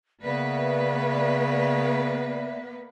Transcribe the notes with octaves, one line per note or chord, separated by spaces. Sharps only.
C#3 A#3 B3 B4 D5 E5